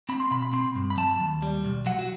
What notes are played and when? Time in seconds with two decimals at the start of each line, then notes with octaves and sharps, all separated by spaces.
0.09 C4 B5
0.20 C6
0.31 B2 B5
0.42 B5
0.53 C4 C6
0.75 G2
0.90 B5
0.97 F#3 A5
1.20 D#2
1.42 G3
1.65 B1
1.86 F#3 F#5
1.99 F#4